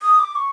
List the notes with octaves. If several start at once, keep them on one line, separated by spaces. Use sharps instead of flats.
D#6
D6
C#6